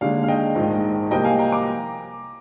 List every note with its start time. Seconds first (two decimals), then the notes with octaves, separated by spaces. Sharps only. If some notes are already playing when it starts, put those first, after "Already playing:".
0.01 D#2 D3 G#3 D5 F5
0.23 F5
0.28 D#5 G5
0.55 A#1 G#2 D#3
1.11 C2 C3 F3 A#3 D#5 G5
1.24 F5 G#5
1.39 G5 A#5
1.52 A#5 D6